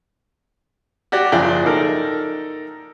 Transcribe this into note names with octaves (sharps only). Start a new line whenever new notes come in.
F#4 G4 D5
F#1 F3 G#4 D5 E5 G5
D#4 A4 A#4